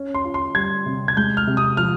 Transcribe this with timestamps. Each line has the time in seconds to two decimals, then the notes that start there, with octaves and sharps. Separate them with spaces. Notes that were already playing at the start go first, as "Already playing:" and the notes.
Already playing: C#4
0.14 C6
0.25 F4
0.34 C6
0.55 G3 G#6
0.86 C3
1.08 G#6
1.17 G#3 G6
1.37 F6
1.47 C3
1.57 D#6
1.77 F3 F6